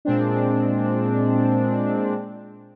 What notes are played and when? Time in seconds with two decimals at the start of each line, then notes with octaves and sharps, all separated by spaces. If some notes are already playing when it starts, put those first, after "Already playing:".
0.05 A#2 G#3 C4 D4